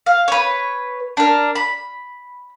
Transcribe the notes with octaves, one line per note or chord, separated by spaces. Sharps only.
F5
B4 C#5
D4 A#4
B5